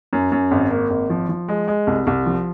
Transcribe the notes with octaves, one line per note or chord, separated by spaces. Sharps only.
F#2
F#2
G#1
A#3
G#1
F3
F3
G#3
G#3
C2
C2
F3